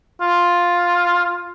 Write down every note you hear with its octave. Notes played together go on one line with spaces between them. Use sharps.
F4